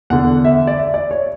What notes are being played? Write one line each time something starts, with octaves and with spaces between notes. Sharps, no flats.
E2 D3 F#5
E5
D5
E5
D5
C#5